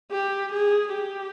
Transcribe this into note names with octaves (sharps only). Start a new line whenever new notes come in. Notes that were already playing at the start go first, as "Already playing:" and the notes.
G4
G#4
G4